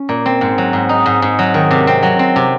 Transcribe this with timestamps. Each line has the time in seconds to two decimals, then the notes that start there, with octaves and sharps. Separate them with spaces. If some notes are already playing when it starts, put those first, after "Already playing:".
Already playing: C#4
0.09 A#2
0.26 C4
0.41 G#2
0.58 F#3
0.73 G#2
0.89 D#4
1.06 G#2
1.22 G#2
1.39 F#3
1.54 D#3
1.71 C3
1.87 C4
2.03 F#3
2.19 C4
2.36 C3